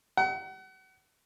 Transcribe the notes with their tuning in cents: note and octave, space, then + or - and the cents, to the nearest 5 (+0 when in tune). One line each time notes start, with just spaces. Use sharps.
F#5 +35